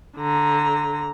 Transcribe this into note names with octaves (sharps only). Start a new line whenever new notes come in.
D3 A#5